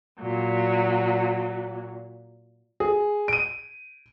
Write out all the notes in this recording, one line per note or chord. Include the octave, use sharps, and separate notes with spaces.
A#2 F#3
G#4
D7 D#7